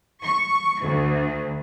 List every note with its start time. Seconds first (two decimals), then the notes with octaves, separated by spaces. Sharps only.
0.23 C#6
0.81 D2